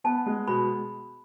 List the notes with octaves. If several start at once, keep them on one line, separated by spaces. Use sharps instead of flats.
B3 A5
G#3
B2 B5